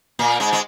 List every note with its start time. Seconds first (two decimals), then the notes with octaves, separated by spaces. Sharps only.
0.19 A#2 A#3
0.40 G#2 G#3
0.53 G#3